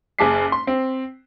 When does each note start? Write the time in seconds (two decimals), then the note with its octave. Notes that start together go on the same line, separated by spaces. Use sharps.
0.19 F#1 G#4 A5 D6 B6 C7
0.52 C6
0.67 C4